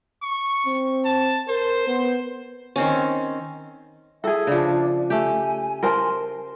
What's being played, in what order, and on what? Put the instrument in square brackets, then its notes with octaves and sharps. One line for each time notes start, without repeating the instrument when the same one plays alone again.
[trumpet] C#6
[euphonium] C4
[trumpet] A5
[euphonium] A#4 [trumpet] C5
[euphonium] B3
[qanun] D#3 C4 C#4
[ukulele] G#4 A4 [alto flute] E5
[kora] C#3 F3 [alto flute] D4
[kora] A3 G4 [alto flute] G#5
[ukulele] A#4 C5 A5